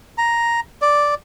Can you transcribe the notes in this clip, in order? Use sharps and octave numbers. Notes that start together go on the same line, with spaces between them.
A#5
D5